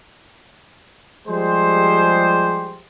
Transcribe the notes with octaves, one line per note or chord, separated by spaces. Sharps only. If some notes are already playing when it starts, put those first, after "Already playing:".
F3 G3 G#3 G4 G#4 C5